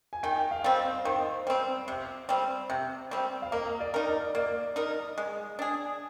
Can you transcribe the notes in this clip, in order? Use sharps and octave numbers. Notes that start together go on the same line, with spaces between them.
G#5
D#3 G5
F5
G3 C4
D#5
D#3 C5
G3 C4
C3
G3 C4
C3 G5
G3 C4
F5
A#3 D#5
D5
D#4 A#4
D5
A#3 D5
D#4 A#4
G#3
D4 G#4